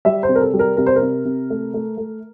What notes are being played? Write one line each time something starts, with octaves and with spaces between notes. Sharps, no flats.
G3 E5
C5
C3
A#4
A4
G3
A#4
C3 A#4
C5
A#4
C3
C3
A3
A3
A3